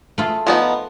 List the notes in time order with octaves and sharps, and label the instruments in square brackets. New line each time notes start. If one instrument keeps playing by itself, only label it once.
[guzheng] A3 F4 G#4
[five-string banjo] F3 B3 D#4